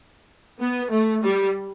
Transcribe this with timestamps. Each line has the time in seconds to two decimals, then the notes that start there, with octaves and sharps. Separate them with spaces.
0.61 B3
0.92 A3
1.23 G3